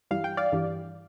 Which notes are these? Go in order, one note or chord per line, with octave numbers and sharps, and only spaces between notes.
G2 E3 G3 F5
G5
D5 F5
G2 E3 G3